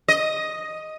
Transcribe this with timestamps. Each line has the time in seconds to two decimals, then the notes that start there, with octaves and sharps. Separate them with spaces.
0.08 D#5